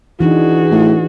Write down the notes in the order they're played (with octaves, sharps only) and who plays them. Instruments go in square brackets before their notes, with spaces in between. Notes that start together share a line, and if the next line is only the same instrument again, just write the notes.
[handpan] E3 D4 D#4 [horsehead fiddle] F#4 G#4
[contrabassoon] A2